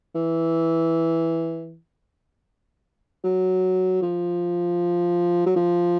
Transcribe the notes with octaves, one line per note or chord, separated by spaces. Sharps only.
E3
F#3
F3
F#3
F3